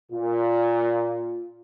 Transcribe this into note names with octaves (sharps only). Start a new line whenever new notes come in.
A#2 F4